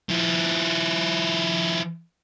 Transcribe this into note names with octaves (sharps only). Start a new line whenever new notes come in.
F3 E4